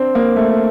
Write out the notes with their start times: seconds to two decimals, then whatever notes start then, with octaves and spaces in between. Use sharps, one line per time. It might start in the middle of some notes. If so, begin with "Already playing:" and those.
Already playing: C4 D4
0.15 A#3
0.36 A3